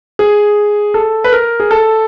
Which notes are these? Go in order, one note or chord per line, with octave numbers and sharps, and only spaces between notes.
G#4
A4
B4
A#4
G#4
A4